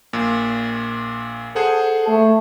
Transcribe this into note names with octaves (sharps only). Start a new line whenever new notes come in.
A#1 A#2
G#4 A4 C5 F#5
A3